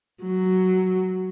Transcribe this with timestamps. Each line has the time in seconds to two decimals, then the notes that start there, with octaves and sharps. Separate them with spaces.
0.22 F#3